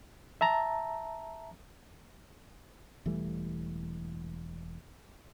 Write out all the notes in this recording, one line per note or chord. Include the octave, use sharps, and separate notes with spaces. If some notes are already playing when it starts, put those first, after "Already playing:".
E5 A5 A#5
E1 E3 G3 A3